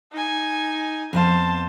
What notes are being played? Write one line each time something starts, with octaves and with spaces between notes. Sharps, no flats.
D#4 G#5
F2 B3 C5 F5 A5